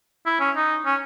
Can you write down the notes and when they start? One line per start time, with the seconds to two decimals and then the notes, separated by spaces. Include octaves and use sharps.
0.26 E4
0.40 C#4
0.56 D#4
0.85 C#4